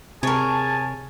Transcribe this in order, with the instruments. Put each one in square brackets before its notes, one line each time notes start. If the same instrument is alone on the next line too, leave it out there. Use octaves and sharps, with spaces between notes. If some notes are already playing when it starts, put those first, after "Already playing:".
[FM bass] C3 [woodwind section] G#4 G#5 A5 [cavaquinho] A#4 C#5